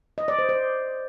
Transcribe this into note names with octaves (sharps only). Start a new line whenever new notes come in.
D#5
D5
C5
C5